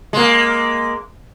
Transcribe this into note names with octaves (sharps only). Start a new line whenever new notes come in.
G#3 A#3